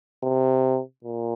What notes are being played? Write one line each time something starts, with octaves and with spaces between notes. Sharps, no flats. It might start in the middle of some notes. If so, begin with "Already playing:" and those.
C3
A#2